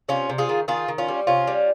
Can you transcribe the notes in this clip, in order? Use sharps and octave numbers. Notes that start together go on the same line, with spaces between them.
C3 C#4 F4
C3
F4 G#4
D#3
D#3 F4 G#4
D#3
C#4 F4
G3
C3 C#4 F4
G3